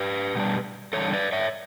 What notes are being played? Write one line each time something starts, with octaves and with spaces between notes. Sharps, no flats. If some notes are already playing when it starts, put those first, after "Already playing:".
Already playing: G4 B4
B2 G3 D4
E2 D3 G3 D4 A4 C#5
B4 D5
C#5 E5